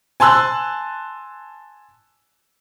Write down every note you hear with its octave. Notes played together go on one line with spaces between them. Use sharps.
G#5 A5 C6 E6 F#6